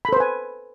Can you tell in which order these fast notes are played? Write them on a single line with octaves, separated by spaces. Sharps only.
B5 A4 C5 B4 G#5